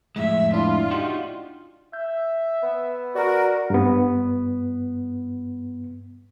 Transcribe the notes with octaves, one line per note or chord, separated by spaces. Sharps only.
F2 A2 G#3 E5
D4 E4 F4
D#4 F#4 G4
E5 G6
B3
F#4 A#4 D5
G2 B3